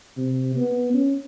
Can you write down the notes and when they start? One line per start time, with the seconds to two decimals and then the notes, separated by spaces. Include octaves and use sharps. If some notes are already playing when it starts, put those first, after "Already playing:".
0.18 C3
0.56 B3
0.94 C#4